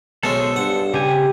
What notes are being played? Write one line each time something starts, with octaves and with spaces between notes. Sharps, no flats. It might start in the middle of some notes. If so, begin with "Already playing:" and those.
B1 G#3 C#4 A4 C5 E5
G2 F#5
C#3 G4 G#5